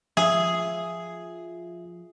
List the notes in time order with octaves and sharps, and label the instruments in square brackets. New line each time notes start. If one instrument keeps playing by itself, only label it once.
[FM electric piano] F3 F4 [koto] G#4 [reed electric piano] E5